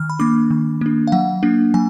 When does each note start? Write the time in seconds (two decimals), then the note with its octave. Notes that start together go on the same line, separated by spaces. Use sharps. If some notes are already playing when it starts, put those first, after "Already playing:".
Already playing: D#3 F6
0.10 B5
0.19 A#3 D4 D6
0.51 D#3
0.81 A#3 D4
1.07 F5
1.12 F#3 F#5
1.43 A#3 D4
1.74 F#3 G#5